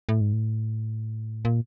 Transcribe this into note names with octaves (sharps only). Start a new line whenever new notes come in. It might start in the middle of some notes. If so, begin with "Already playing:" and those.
A2
G#2
A2
A#2